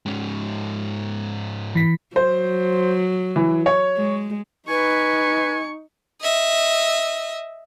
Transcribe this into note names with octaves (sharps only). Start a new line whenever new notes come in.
G#2 C#4
E3 B6
F#3 C5
E3
C#5
G#3
D#4 B4 G#5 C#6
D#5 E5